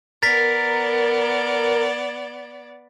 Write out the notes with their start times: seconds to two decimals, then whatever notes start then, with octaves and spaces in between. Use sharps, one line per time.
0.23 B3 A#4 D5 A6 B6